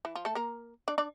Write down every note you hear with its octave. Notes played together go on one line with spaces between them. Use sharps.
E3 E4
F3 F4
A3 A4
A#3 A#4
D4 D5
D4 D5